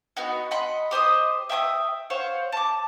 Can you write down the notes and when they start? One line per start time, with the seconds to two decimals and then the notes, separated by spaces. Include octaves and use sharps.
0.17 B3 D#4 F#4
0.51 D#5 F#5 B5 C6
0.91 G4 C5 D#5 D#6
1.49 E5 G5 B5 D#6
2.10 C5 C#5 F5 F#5
2.52 A5 D6